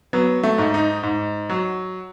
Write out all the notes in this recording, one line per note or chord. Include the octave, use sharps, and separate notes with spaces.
F#3 B3
A3
G#2
D#4
G#2
F#3